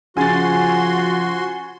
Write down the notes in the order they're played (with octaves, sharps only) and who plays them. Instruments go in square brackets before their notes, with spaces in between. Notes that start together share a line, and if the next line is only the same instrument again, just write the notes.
[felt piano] C#3 A6 [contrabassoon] F3 [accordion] F#4 C6 [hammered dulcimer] G#5